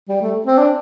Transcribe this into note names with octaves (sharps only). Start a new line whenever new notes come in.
G3
A3
C4
D4